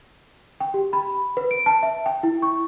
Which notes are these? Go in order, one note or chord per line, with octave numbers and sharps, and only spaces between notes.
G5
G4
B5
B4
D7
A5
E5
G5
E4
C#6